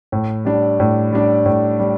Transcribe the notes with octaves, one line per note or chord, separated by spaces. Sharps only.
A2
G3 D4
A2
G3 D4
A2
G3